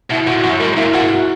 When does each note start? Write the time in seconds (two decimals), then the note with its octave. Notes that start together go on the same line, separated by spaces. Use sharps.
0.11 B2 E4
0.27 A#2 F#4
0.43 F#2 F#4
0.60 G#2 A#4
0.77 A#2 E4
0.94 G#2 F#4
1.11 F#4